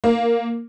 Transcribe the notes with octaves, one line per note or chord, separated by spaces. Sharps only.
A#3